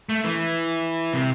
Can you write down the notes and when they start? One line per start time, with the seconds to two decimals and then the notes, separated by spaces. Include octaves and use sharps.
0.09 A3
0.24 E3
1.14 C3